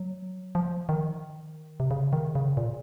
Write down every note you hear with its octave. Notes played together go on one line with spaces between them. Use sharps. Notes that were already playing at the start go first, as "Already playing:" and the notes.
Already playing: F#3
F3
D#3
C3
C#3
D#3
C#3
A#2